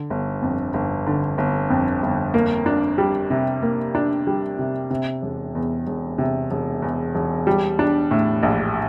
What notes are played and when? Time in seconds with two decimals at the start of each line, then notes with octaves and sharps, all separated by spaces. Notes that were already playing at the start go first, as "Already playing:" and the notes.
Already playing: D3
0.10 G1
0.42 F2
0.74 G1
1.07 D3
1.38 G1
1.70 F2
2.02 G1
2.34 A#3
2.66 D4
2.98 G3
3.30 C3
3.62 A#3
3.95 D4
4.27 G3
4.59 C3
4.90 C3
5.22 E1
5.55 E2
5.87 E1
6.18 C3
6.51 E1
6.82 E2
7.15 E1
7.47 G3
7.79 D4
8.11 A2
8.43 A#1